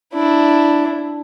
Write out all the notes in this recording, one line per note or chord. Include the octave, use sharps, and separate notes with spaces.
D4 E4